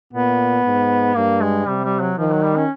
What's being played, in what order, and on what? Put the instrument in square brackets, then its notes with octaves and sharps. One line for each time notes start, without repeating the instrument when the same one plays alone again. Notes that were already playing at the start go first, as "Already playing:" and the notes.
[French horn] A#2 [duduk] B3
[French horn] G#2
[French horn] G2 [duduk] A#3
[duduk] G#3
[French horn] C3 [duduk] G3
[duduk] G3
F#3
[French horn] D#3 [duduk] F3
[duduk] F#3
G3
C#4